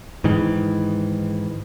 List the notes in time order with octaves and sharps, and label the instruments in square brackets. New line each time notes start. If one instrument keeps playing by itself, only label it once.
[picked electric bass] G#2 D#3 E3